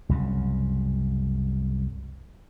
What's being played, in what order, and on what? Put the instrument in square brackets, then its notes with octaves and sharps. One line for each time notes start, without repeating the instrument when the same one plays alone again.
[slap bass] C2 F#2 C#3